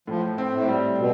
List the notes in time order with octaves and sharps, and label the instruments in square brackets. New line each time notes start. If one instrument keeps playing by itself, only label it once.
[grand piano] A2 [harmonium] F3
[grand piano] C4
[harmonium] A2
[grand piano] G3
[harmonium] B2